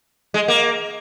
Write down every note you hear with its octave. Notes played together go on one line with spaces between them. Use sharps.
G#3
A#3